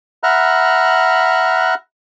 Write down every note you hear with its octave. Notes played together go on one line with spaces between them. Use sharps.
E5 F#5 A#5 B5 F6 F#6